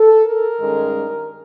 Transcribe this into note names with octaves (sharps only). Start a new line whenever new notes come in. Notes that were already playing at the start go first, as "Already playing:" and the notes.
Already playing: A4
A#4
G2 D#3 G#3 C#4